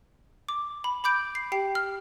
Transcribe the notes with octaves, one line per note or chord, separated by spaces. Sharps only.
D6
B5
B5 D6 G6 D7
C7
G4 G5 C7
F6